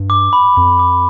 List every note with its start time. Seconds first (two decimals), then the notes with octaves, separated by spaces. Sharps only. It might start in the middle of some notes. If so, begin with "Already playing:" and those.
Already playing: G2
0.10 D6
0.33 B5
0.57 F2 D6
0.79 D6